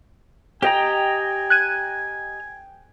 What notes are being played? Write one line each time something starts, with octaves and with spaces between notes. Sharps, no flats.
G4 D#5 G5 G#5 A#5
F#6 G#6 D#7